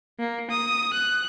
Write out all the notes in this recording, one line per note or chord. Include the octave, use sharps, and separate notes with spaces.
A#3
D#6
F#6